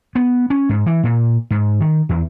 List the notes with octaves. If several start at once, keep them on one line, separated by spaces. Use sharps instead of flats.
B3
C#4
G#2
E3
A#2
G#2
D#3
E2